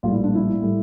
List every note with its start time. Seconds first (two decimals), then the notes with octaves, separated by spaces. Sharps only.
0.03 A#1 A2 G3 F4
0.13 E4
0.24 D4
0.35 E4
0.62 A2 G3